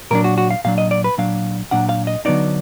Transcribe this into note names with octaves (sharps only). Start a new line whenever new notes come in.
A#2 F#3 D4 A#4
F#4
F#4
F5
A#2 F#3 D4 F5
D#5
D5
B4
A#2 F#3 D4 F5
A#2 F#3 D4 F#5
F5
D#5
D3 F#3 B3 D#4 D5